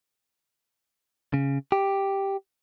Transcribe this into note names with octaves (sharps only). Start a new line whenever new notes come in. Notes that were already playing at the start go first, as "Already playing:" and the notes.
C#3
G4